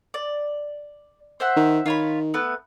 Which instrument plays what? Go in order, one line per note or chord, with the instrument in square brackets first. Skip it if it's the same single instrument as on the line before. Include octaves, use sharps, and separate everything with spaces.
[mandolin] D5
C5 E5 F#5
[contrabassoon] D#3
[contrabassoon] D#3 [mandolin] F4 C#5 B5
[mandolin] A3 B3 B4